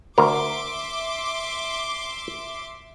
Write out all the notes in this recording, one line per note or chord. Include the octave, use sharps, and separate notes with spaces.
D2 A#4 E5 C6 D6